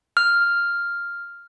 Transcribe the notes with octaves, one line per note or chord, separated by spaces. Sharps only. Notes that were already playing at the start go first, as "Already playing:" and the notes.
F6